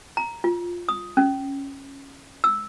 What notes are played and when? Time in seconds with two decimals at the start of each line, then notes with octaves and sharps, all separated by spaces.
0.17 A#5
0.44 F4
0.89 D#6
1.17 C#4
2.44 E6